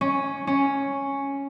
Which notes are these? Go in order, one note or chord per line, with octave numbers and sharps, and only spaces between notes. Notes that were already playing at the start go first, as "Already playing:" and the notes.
C#4
C#4